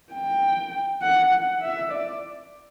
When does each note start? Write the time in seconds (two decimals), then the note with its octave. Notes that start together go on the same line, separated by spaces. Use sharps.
0.13 G5
1.02 F#5
1.33 F#5
1.61 E5
1.92 D5